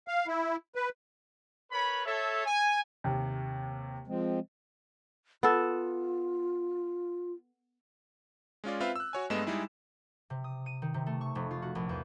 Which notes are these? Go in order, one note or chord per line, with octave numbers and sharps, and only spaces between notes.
F5
E4
B4
A#4 B4 C#5 B5
A4 C#5 E5
G#5
D#2 C3
F3 G#3 C4
B3 F4 A4
G#3 C#4 F4 D5
C4 F4 B4 E5 F5
E6 F#6
F#4 C#5 G#5
G2 G#3 A3 B3 D#5 E7
G3 G#3 D#4 E4 G#4
C3
D#6
D#7
D#3
C3
A3
C#6
F1
F4
F#4
A#1
E2